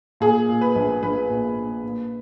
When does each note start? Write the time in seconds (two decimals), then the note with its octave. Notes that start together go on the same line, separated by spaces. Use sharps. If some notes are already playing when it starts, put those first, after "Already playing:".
0.20 A#2 G#4
0.49 A#2
0.61 B4
0.75 A#1
1.03 A#1 B4
1.30 A#2
1.56 A#2
1.83 A#2